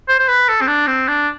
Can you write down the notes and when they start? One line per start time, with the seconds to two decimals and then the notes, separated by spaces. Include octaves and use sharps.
0.09 C5
0.19 C5
0.28 B4
0.49 A4
0.62 C4
0.68 D4
0.88 C4
1.08 D4